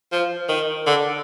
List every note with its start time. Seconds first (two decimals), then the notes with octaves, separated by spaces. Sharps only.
0.12 F3
0.49 D#3
0.87 D3